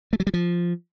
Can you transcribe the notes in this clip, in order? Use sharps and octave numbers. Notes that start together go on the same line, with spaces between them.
A3
F#3
G3
F3